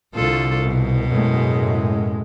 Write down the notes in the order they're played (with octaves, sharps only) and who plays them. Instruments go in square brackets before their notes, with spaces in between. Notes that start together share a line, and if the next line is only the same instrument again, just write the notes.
[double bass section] C2 [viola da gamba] D3 F4 A4
[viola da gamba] B2
[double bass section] F#2 A2 G#3